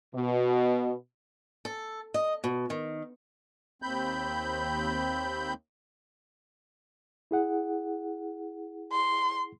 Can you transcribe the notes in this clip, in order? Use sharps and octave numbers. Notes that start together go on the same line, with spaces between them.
B2
A4
D#5
B2
D#3
D#2 C4 B5 G6
E4 G#4 F#5
C6